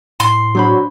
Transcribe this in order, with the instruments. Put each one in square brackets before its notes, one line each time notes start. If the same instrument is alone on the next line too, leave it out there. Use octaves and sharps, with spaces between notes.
[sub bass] A2 [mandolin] C6
[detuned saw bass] F#3 [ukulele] D4 C5 B5